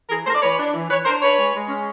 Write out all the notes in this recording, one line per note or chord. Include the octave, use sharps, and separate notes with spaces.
E3 G#4 A#4
A3 A#4 C5
D5
E3 B4 C#5
D4
E3
E3 B4 C#5
D4 A#4 C5
D4 B4 C#5
G#3
G#3
C#4